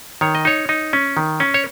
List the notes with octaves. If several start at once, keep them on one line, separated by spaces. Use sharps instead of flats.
D#3 C#5
D#5
D#4 C#5
D#4
C#4
D#3
C#4
C#5